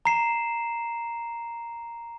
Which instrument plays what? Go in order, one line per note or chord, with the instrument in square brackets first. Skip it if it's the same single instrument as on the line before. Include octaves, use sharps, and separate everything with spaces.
[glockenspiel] A#5 C7 E7